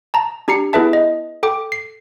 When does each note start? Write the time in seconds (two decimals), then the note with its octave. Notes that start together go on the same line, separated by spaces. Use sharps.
0.14 A5 A#5
0.48 D4 G4 A#5 C7 C#7
0.73 B3 E4 G#4 B4 E5 A5
0.93 D#5
1.43 A4 G5 D6
1.72 C7